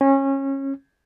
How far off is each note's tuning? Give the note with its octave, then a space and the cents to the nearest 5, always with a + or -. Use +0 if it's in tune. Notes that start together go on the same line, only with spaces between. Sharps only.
C#4 -25